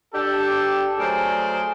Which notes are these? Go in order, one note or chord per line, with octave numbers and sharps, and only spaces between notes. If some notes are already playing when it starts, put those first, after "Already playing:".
D4 G4 A4
F#3 A3 G#4 A#4 C5 D5